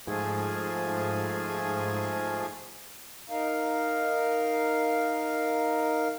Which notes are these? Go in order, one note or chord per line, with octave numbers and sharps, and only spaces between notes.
G#2 F3 A3 G#4
D#4 A#4 F5